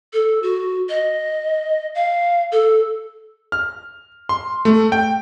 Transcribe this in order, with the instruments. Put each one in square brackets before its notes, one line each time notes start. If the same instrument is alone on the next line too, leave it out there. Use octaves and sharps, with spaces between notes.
[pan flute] A4
F#4
D#5
F5
A4
[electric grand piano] F6
C6
A3
G5